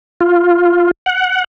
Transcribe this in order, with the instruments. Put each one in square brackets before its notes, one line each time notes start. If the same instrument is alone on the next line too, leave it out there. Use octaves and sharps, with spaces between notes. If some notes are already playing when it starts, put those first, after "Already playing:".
[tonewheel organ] F4
F#5